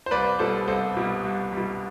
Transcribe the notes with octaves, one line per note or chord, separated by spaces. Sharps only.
C5
C2 B4 D5
B2 G3 A4 C5
C2 A4 C5
B2 G3
C2
B2 G3